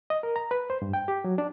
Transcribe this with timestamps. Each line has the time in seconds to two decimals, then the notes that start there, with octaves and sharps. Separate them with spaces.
0.10 D#5
0.23 A#4
0.36 A#5
0.51 B4
0.70 C5
0.82 G2
0.93 G5
1.08 G4
1.24 F#3
1.38 D4